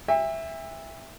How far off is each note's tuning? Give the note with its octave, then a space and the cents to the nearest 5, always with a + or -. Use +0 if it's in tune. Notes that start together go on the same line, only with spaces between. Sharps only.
E5 +0 G5 +45